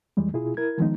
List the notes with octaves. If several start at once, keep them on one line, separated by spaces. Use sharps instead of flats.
F2 E3 G3 G#3
B2 E4 F4 G#4
E4 A#4 G#6
D#3 F3 G#3 B3 D#4